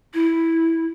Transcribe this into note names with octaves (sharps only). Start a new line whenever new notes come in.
E4